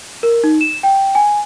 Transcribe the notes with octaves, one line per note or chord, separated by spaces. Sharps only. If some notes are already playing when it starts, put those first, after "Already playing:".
A#4
D#4
E7
G5
G#5